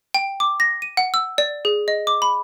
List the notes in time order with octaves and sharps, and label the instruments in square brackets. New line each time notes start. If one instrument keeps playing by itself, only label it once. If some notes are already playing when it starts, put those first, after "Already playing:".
[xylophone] G5
D6
A#6
D#7
F#5
E6
D5
G#4
D#5
D6
B5